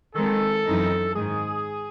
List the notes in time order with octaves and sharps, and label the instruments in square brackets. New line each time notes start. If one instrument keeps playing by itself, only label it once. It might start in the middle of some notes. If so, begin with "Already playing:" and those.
[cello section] D#3 G#3 C4 [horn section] A4
[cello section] F#2 E3 C4 D#4
[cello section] G#2 D#3 G#3 [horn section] G#4